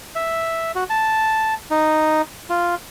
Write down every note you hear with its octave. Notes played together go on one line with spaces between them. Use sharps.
E5
F#4
A5
D#4
F4